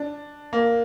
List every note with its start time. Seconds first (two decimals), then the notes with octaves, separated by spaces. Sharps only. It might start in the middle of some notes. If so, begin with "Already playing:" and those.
Already playing: D4
0.53 A#3